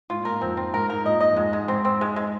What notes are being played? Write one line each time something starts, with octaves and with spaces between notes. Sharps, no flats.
G#2 F4
A#2
A#4
G#2
F2 C4
C4
G#2 A#4
G#2 A#4
A#2 D#5
D#5
F2
G#2 G#3
G#3
G#2 C4
C4
G#3
G#3